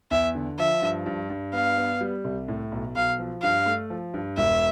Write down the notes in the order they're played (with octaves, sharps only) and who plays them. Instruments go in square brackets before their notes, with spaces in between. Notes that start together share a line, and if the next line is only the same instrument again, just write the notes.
[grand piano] E2 [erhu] E5
[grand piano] D3
[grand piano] F3 [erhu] E5
[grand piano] G2
G2
G2
[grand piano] B3 [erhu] F5
[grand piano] B3
G3
C2
A2
B1
[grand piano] B1 [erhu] F5
[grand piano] F3
[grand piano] G2 [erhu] F5
[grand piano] A3
F3
G2
[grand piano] E1 [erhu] E5